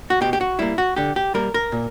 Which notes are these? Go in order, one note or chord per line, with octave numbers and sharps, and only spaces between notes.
F#4
B2 G4
G4
F#4
G3 A#3 E4
F#4
D3 G4
G4
G3 A#3 A#4
A#4
A#2